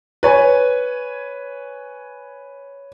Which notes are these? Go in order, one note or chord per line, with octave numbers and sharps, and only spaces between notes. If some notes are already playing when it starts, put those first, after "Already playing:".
B4 C#5 G#5